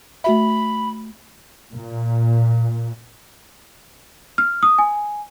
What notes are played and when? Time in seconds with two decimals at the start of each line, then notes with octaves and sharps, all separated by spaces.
0.24 A3 F#4 E5 B5
1.73 A#2
4.38 F6
4.63 D#6
4.78 G#5